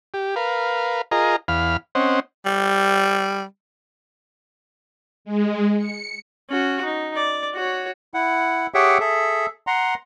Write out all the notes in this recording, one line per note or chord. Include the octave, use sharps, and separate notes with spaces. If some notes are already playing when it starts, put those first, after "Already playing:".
G4
A#4 B4 F5
F4 G#4 A#4 D#5 A#5
E2 F5 B5 F6
C4 C#4 C5 D#5 F#5
G3
G#3
C#7
C#4 F#4
D#4
D5
F#4 C#5
E4 F#5
G4 G#4 C#5 E5 F#5 G5
G#4 A4 E5
F#5 A#5 C6